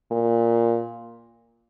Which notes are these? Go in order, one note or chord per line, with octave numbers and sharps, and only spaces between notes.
A#2